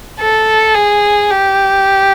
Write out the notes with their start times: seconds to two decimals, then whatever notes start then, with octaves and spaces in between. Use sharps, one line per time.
0.19 A4
0.74 G#4
1.30 G4